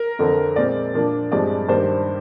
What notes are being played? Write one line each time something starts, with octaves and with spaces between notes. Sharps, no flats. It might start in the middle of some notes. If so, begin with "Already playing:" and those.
Already playing: A#4
F2 D3 F3 C4
A#2 G#3 C4 D5
A#2 F3 A#3 D4
G2 F3 G#3 C4 D5
G2 D#3 A#3 D4 C5